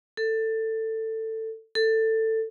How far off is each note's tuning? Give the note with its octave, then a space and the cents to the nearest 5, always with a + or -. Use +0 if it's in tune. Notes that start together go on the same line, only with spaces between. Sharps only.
A4 +15
A4 +15